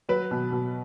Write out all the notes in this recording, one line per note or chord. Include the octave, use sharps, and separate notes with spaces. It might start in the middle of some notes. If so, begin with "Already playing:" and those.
F#3 B4
B2
B2